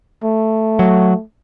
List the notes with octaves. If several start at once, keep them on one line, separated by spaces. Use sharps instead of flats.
A3
F#3